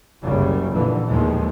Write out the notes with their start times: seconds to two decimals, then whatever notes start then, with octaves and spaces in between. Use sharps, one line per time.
0.22 F#1 C2 F#2 C#3 G3
0.71 F2 A#2 D3 E3
1.06 D#2 A2 D#3 F3 G#3 A#3